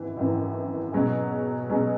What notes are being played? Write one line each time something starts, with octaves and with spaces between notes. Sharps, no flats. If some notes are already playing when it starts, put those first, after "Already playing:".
Already playing: G#1 F#2 E3
G#1 F#2 E3
B2 F#3 C#4 G#4
B2 F#3 C#4 G#4